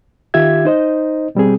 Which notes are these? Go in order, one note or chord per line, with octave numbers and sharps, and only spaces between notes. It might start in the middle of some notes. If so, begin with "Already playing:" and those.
D#3 F4 G4 E5 G#6
D#4 C5 D#5
B2 G3 C4 G#4